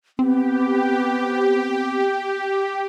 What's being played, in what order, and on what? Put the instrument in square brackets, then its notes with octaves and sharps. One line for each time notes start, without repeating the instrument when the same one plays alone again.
[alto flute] B3 [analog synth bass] C4 [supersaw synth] G4